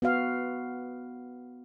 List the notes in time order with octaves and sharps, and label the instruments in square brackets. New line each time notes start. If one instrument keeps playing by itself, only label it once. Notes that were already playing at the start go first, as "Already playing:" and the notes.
[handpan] B3 F#4 F5